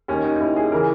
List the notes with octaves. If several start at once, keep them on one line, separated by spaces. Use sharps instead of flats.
D#2 D#3 C#4
D#4
D#4
D#2 D#3 E4
G#4
C#3 E3 A#4